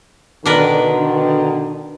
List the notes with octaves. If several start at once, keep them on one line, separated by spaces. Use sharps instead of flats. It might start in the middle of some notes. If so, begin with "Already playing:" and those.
B2 D3 D#3 D4 A#4 B4